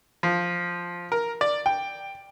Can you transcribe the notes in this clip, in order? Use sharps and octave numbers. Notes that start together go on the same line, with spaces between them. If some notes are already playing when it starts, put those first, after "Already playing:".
F3
A#4
D5
G5